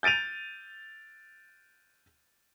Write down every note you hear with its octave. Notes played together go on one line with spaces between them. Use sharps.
G6 A6 D7 D#7 F7